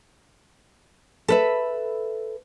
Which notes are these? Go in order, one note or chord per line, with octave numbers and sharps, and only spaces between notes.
A4 B4 E5